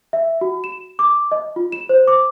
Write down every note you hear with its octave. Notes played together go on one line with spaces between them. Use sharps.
E5
F#4
E7
D6
D#5
F4
E7
C5
D6